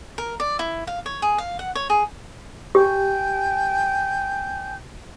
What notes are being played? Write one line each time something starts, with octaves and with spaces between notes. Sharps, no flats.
A#4
D5
E4
F5
C#5
G#4
F5
F#5
C#5
G#4
G4 G5 G#5 G6